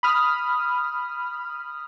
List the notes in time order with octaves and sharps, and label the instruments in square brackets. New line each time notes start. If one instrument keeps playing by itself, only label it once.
[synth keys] B5 D#6 F6